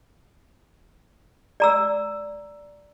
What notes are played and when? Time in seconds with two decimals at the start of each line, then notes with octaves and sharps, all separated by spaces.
1.60 D5 A#5 E6